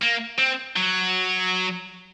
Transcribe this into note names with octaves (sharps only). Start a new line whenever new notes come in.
A#3
C4
F#3